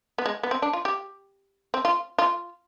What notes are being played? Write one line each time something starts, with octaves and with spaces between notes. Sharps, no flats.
B3
G#3
B3
C4
D4
F4
G4
C4
F4
F4